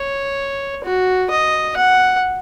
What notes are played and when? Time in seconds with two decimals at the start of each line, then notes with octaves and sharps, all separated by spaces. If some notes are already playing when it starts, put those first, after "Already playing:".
Already playing: C#5
0.84 F#4
1.30 D#5
1.76 F#5